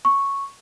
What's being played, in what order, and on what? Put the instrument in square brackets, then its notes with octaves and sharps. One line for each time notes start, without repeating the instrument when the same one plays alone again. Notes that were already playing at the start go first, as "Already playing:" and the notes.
[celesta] C#6